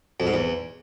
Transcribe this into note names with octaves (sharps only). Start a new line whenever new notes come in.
F2
G#2
E2